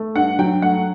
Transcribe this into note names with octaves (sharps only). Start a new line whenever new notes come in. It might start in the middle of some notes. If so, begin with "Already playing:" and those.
Already playing: A3
G2 F#5
F#3 G5
A3 F#5